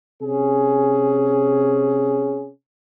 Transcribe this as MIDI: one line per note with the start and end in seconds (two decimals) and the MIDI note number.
0.22 2.49 48
0.22 2.49 61
0.22 2.49 68